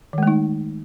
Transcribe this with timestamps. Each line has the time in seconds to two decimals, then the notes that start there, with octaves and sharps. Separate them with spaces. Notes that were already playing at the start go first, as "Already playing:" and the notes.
0.13 D#3
0.18 G#3
0.23 A3
0.27 D#4